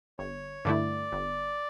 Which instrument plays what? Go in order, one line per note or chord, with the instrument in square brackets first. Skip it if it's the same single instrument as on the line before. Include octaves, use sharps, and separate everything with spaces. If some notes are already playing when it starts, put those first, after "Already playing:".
[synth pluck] G1 [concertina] C#5
[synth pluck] G2 D3 A3 E4 [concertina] D5
[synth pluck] G1